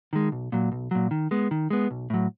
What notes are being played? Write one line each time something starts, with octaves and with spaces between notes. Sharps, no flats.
D#3 G#3
B1
A#2 F#3
B1
A#2 F#3
D#3
G#3 B3
D#3
G#3 B3
B1
A2 F#3